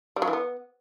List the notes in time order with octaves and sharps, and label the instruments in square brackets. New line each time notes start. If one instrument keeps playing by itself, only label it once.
[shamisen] G3
F#3
E3
B3